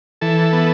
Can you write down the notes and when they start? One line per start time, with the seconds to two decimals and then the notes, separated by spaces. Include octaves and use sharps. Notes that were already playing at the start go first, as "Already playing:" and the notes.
0.21 E3 A4
0.53 B3